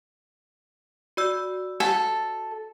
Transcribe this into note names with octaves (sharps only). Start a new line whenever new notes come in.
F#4 D5 E6
A4